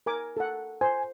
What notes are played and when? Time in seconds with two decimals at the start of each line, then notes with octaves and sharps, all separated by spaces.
0.06 A#4 G#5 D6
0.37 A4 F#5
0.81 C5 G#5